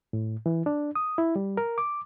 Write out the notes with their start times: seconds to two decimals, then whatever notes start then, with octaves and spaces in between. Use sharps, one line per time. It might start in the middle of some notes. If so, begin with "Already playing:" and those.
0.13 A2
0.46 E3
0.66 D4
0.95 D#6
1.18 E4
1.36 G3
1.57 A#4
1.78 D6